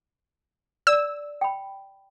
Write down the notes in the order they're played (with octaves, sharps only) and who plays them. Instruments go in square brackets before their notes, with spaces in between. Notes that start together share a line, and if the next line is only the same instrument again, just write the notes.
[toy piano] D5 [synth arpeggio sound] E6
[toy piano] G5 B5